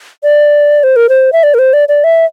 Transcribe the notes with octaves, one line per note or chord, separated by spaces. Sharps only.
D5
C5
A#4
C5
E5
D5
A#4
C5
D5
D5
E5